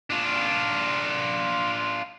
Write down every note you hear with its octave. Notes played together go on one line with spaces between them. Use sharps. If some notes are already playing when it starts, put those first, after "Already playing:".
D4 F4